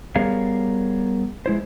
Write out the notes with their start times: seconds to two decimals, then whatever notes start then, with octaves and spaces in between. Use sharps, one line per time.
0.16 G3 B3 G#4 A#4 C#5 F5
1.46 G#3 E4 C5